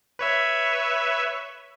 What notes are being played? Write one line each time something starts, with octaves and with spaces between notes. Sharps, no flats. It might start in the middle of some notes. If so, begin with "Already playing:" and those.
B4 C#5 E5